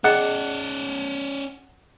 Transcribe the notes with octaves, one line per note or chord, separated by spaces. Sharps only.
C#4 G#4 D5 D#5 F#5 G5